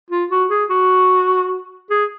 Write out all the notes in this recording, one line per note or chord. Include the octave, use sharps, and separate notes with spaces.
F4
F#4
G#4
F#4
G#4